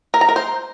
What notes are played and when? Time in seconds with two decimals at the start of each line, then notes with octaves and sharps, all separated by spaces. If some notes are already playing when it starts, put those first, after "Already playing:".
0.14 A#4
0.21 A#5
0.29 A#4
0.36 C5